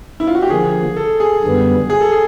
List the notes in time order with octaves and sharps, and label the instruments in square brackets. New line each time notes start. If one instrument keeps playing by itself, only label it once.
[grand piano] E4
F4
F#4
G4
[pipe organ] D3 F3 A#3 [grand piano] G#4
[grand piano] A4
G#4
[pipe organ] F#2 D3 G3 B3
[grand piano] G#4
A4
G#4